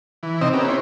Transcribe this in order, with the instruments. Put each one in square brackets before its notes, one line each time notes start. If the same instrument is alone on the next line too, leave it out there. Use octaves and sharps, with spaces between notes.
[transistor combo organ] E3
C3 C4 D#4 D#5 E6
B3 C#4 G4 A#4
E4 C5 C#5